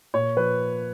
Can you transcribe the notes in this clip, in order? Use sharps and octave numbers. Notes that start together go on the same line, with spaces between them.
A#2 C#5
F3 B4